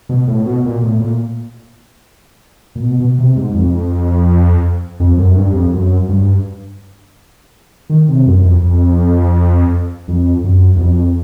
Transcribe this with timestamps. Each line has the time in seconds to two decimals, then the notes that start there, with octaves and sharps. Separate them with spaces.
0.09 B2
0.28 A2
0.46 B2
0.65 A#2
0.82 A2
1.00 A#2
2.75 A#2
2.82 B2
3.00 B2
3.19 C3
3.36 G#2
3.54 F2
5.00 F2
5.17 F#2
5.35 G2
5.54 F2
5.73 F#2
6.09 G2
7.90 D#3
8.09 C3
8.26 F#2
8.44 F2
8.62 F2
10.08 F2
10.44 F#2
10.76 E2
10.81 F2